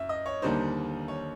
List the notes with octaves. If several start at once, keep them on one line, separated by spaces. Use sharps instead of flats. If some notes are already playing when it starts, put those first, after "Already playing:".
Already playing: F#2 E5
D#5
C#5
D#2 D3 G3 A#3 D#4 C5
C#5